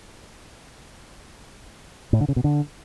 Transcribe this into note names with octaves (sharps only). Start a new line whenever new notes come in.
A2
D3
C#3
B2
D3